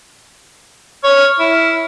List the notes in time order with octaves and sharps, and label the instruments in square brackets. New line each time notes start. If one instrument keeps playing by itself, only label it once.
[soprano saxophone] C#5 [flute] F6
[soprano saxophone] E4